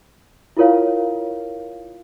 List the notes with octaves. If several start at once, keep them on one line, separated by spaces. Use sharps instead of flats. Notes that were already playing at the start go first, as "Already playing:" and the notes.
E4 F4 A#4 C#5 F5